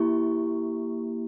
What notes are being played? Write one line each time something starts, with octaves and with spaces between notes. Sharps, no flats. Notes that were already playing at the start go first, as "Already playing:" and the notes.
Already playing: A#3 E4 G4 C#6